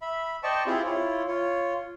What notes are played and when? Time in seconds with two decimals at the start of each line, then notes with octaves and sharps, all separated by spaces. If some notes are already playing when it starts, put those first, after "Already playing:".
0.02 E5 B5
0.43 C5 D5 D#5 G5 A5 C#6
0.66 C4 E4 F4 G4 G#4
0.85 E4 F4 C#5
1.28 F4 C#5